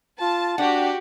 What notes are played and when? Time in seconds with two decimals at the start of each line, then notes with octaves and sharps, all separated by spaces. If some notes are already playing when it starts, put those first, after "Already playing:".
0.21 F4 A5
0.58 D4 F#4 G4 F#5